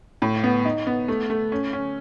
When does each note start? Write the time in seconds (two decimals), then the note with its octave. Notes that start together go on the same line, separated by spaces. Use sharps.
0.22 A2
0.44 B3
0.65 D#4
0.87 B3
1.08 A3
1.30 A3
1.52 C#4
1.73 C#4